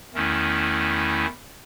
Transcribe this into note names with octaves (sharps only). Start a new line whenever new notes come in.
E2 D#3 A3 C#4 E4